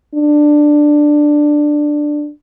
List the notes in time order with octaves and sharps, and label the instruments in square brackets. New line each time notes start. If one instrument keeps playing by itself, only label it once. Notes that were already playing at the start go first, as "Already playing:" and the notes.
[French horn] D4